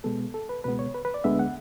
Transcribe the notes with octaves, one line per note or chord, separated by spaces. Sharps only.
B2 G#3 B3 A4
A4
B4
C#2 B2 G#3 B3 B4
C#5
B4
B4
D5
D2 D3 G#3 B3 E5
F#5